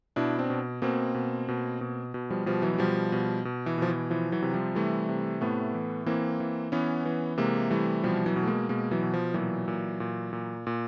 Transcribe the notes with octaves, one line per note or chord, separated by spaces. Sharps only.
B2 D4 E4
C4 D4
B2
B2 A#3 C4
B2
B2
B2
B2
F3 G3
B2 F3 G3
E3 F#3
F#3
B2 F3 G3
B2
B2
E3
B2 F3
E3
E3 F3
E3 F#3
C3
F3 G3
E3 G3 A3
C3
A2 A3 B3
E3
E3 A#3 C4
E3
E3 B3 C#4
E3
C3 G#3 A#3
E3 G3 A3
B2 F3 G3
E3 F#3
B2
A3
G#3 A#3
B2 G#3 A#3
E3 F#3
B2
F3
A#2 E3 F#3
A#2
A#2
A#2
A#2